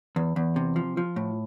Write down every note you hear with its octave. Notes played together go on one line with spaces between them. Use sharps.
E2
E2
C3
F3
F3
A2